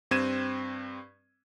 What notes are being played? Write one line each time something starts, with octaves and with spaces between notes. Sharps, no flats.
G2 C4 G#6 D#7 E7